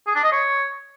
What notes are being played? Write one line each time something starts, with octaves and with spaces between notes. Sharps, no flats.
G#4
D4
D#5
C#5